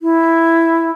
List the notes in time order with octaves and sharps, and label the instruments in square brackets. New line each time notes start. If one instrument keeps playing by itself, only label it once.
[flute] E4